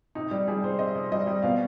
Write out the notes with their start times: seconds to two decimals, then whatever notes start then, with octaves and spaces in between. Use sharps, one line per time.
0.15 C3 D#4
0.31 G3
0.47 G3 G#4
0.63 C3 C5
0.79 C4 D#5
0.95 C3
1.12 G3 D#5
1.27 G3
1.42 B2 F5